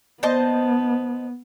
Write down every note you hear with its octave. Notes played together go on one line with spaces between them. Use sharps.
B3 C5 D#5 A5